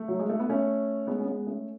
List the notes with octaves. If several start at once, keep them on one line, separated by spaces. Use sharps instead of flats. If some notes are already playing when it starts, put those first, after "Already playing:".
Already playing: A3
F#3
G#3
A3
B3
A3 C#4
G#3 B3
C#4
G#3 B3
A3 C#4